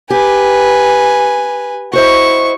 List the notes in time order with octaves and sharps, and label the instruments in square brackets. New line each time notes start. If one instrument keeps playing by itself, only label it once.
[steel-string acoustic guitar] G4 [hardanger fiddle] B4 G#5
[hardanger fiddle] E4 C#6 [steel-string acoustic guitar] F#4 C5 D#5